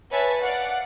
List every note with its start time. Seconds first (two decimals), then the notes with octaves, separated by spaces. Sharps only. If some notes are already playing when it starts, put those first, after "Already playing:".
0.10 B4 C#5 E5 G#5 A5
0.41 D5 F5 F#5